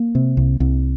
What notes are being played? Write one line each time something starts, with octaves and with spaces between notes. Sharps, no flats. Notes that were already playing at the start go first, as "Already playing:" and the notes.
Already playing: A#3
C3
C2
C2